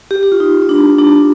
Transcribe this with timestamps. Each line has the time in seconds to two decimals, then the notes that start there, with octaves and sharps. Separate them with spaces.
0.11 G4
0.23 G4
0.32 F4
0.40 D#4
0.62 D#4
0.69 D4
0.98 D4